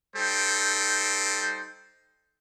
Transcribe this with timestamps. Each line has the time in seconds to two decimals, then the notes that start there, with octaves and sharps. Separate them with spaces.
0.15 G3 D#4 A4 C5 G5